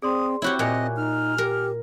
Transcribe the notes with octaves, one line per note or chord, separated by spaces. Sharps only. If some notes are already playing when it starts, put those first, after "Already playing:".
C4 G#4 D5 C6 D#6
C4 E4 F#4 G4 C#5
A#2 C#5 D#5 G#5 F#6
D#4 F6
G4 A#4